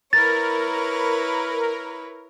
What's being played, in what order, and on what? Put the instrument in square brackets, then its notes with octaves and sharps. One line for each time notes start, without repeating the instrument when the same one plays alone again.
[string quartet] E4 B4 C#5 [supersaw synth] A#4 [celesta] A6